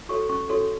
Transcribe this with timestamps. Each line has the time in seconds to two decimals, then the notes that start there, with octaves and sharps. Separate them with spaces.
0.09 F#4 A4 C#5 C#6
0.29 C#4 C#6
0.49 F#4 A4 C#5